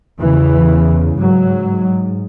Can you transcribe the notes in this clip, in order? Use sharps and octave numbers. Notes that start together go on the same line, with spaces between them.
E2 C#3 E3
G#2 F#3